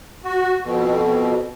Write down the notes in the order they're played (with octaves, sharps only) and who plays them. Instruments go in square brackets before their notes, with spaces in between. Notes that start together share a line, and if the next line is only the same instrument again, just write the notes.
[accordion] F#4
F2 B2